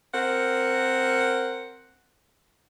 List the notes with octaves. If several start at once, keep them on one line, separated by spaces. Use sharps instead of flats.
C4 A#4 F#5